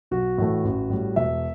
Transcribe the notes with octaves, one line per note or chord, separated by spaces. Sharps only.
B1 F#4
A2 E3 A3
A1
A2 G3
E1 E5